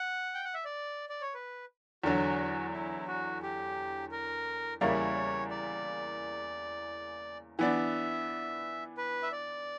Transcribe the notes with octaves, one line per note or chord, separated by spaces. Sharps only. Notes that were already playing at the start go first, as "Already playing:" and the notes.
Already playing: F#5
G5
F#5
E5
D5
D5
C#5
B4
E2 D3 F#3 F#4
E4
F#4
G4
A#4
E2 C#3 G3 A#3 E4 C#5
D5
E3 B3 D4 E5
B4
E5
D5